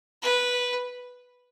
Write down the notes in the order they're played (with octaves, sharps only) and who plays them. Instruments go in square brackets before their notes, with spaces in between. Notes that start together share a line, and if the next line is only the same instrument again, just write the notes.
[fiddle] B4